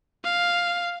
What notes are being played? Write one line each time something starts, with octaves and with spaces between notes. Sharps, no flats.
F5